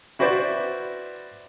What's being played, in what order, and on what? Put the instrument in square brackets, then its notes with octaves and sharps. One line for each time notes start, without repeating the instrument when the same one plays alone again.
[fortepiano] E4 F#4 B4 C5 D5